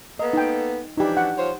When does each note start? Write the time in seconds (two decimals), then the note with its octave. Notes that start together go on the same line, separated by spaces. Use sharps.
0.19 A#3 B3 A4 D#5
0.33 D#4 G5
0.97 E3 F3 D4 D#4 G4
1.17 F#5
1.37 F3 C5 C#5